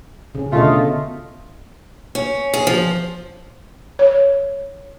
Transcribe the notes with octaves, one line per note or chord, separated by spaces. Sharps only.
C#3 C#4
B2 D3 A3 F4 D#5
C#4
G#4
F3
C#5